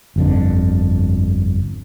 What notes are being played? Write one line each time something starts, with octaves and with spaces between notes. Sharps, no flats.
G1 F2 D3